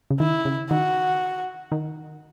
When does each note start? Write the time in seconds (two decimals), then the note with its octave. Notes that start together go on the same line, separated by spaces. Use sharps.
0.11 C#3
0.20 D#3 E4
0.45 C#3
0.70 D#3 F#4
1.72 D#3